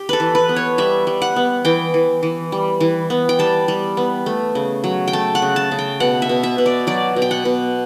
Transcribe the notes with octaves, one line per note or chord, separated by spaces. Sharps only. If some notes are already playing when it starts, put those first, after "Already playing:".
Already playing: G4
A4 B4
E3
B4
B3
C#5
G3 E5
G3
F#5
B3
E3 G5
E3
E3
G3
E3
B3
G5
G3 A5
G3
B3
A3
C#3
F#3
G5
A3 A5
F#5
C#3
A5
C#3
G5
B2 F#5
E5
B2
E5
B2
D5
F#3 D5
B2
G5
F#5
B2